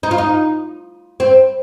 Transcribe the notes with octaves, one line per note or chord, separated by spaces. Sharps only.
D#4
F4
D#4
C4